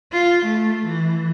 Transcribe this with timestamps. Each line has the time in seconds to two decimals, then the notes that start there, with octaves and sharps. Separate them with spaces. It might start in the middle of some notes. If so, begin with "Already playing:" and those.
0.13 F4
0.46 A3
0.86 E3